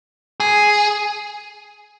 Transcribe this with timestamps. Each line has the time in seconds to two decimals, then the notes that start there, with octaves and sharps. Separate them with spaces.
0.40 G#4